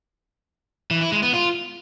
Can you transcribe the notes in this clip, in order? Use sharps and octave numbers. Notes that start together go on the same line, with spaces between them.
E3
E4
G#3
B3
F4